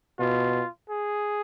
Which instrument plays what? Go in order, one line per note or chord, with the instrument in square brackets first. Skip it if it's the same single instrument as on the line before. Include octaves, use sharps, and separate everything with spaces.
[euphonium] B2 [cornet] F4
[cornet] G#4